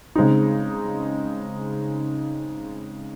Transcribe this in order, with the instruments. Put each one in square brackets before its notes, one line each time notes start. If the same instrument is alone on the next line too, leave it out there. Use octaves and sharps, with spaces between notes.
[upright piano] C#3 G#3 C4 D#4